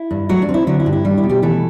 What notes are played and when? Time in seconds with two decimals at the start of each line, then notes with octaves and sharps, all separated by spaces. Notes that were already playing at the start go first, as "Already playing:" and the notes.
Already playing: E4
0.11 G2
0.29 F#3 A3 F#4
0.42 D4
0.49 C4
0.54 E4
0.67 D3 F#3 F#4
0.80 E4
0.86 G2
0.92 E4
1.05 G3 D4
1.18 E4
1.23 B2
1.29 G3 G4
1.42 E3 A3 A4